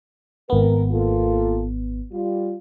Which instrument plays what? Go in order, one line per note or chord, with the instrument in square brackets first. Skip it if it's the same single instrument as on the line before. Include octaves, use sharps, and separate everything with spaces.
[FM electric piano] G#1 B3 [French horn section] A#4
[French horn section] A#3 F4 A4
G3 F4